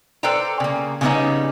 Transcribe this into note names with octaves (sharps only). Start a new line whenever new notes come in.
A4 B4 C5 D5 G5 A#5
C#3 A#3
C#3 G3 B3 C#4 D#4 D#5